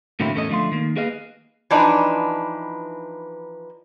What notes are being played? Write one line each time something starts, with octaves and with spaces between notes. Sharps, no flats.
A2 D3 F#3 A#3 C4 E4
E2 A2 C#4 A4 C#5 D#5
D3 F3 A3 F5 C6
D#3 A#3
A#3 G#4 B4 D#5 F5
E3 F3 D4 D#4 B4